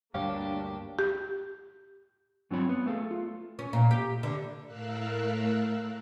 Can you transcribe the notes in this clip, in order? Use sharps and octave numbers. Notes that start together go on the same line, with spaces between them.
D2 G2 G3 A#3 D4 G4 C#5 F5
G4
G2 F#3 C4 F4 C#5 B5
B3
A3 G#4 A4 F5
F4
C#4
A#2
G4
D3
A2 A3 A#4 F5 E6 F#6